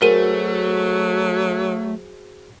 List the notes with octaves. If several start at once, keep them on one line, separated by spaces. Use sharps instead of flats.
F#3 A3 F#4 G#4 A#4 C5 D#7